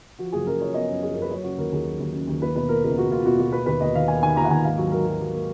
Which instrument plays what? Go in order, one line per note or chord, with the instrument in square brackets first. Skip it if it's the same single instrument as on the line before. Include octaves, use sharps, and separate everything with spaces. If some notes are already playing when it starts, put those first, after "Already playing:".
[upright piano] F3 F#4
F#1 G#4
F#2 A#4
F3 C#5
B3 D#5
F#2
F3 G#4
A#4
F#2 B4
F#3 C#5
C#3 F#4
D#2 A#4
D#2 G#4
F#3
D#2
C#3
D#2
A#3 B4
B2 B4
A#3 A#4
C#2 A#4
C#2 F#4
A#3 F4
B2 F#4
B2 F#4
A#3 B4
D#2 B4
D#2 D#5
D#3 F5
A#3 G#5
D#3 G#5
D#2 A#5
F#5
D#2 G#5
G#2 F5
F#3
F#3 A#4
F#3
F#3
A#3